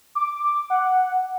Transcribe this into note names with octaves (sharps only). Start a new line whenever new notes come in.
D6
F#5